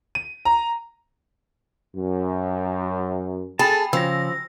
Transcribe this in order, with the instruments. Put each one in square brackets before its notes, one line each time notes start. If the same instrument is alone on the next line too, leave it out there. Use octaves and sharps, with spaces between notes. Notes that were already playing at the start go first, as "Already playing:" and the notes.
[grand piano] D#7
A#5
[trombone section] F#2
[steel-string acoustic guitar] G#4 [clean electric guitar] A4 A5 [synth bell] G5 B5
[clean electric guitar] C#3 [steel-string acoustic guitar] F3 [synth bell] E6 A#6